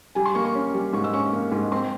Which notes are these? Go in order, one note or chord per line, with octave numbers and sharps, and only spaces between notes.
G3 G#5
C6
A#3 C#6
C#6
C#4
G3
G#2 C#6
E6
C#4 C#6
A#3
G#2
C4 C6